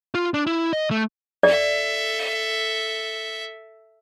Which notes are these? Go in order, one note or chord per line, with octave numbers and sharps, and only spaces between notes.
F4
D4
E4
D#5
A3
A4 D5 E5